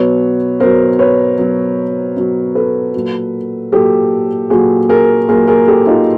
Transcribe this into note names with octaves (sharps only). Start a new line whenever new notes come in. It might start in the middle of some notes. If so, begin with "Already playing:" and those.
Already playing: B2 F#3 B4 C#5
B2 F#3 A#4 C5
B4 C#5
B2 F#3
B2 F#3
A4 B4
A#2 F#3
A#2 F#3 G4 A4
A#2 F#3 F#4 G#4
G#4 A#4
A#2 F#3 G#4 A#4
G#4 A#4
G4 A4
D#4 F4